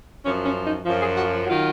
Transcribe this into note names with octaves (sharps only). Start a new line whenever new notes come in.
F#2 F3 C#4
C#4
D#4
F#2 F3
G#4
F#4
D#3 F#3 F4